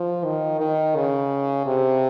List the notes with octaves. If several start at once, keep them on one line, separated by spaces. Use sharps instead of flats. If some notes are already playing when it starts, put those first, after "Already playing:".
Already playing: F3
D#3
D#3
C#3
C3